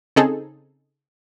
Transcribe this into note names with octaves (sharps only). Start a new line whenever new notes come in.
C#3 C4 D#4 G#4 A4